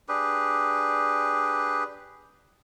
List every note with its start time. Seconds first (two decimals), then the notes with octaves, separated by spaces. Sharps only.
0.08 D4 G4 G#4 B4